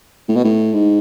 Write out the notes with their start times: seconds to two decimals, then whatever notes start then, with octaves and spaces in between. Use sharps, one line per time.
0.29 A2
0.36 B2
0.44 A2
0.74 G#2